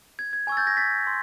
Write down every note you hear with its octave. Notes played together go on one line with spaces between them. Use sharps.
G#6
G#6
G#5 C#6 E6 G#6
G6 A6
G#6 A#6
A6 B6
C6